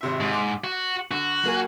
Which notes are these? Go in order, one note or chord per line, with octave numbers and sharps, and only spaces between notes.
G#1 C3 E5
G#2
D6
F#4
D3 F#4
F#3 A#3 G#5